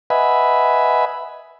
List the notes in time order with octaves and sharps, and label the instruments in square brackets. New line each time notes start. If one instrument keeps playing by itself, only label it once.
[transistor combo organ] B4 D#5 E5 F#5 G#5 B5